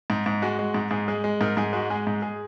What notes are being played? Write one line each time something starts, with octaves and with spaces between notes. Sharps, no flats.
G#2
G#2
G#3 F#4
G#3
G#2
G#2 G#4
G#3 G#4
G#3
G#2 A#4
G#2 G#4
G#3 F#4
G#3 G#4
G#2
G#4